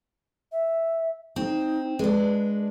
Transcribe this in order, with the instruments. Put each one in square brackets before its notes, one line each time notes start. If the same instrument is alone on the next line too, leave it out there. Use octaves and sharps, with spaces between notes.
[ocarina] E5
[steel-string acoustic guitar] C4 [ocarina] D#4
[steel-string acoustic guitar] G#3 D4 [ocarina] B4